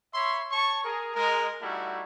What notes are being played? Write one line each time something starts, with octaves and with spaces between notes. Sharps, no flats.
C#5 E5 B5 C6
C#5 A5 C#6
G#4 A#4
G#3 A#4
G3 A3 D#4 E4 F#4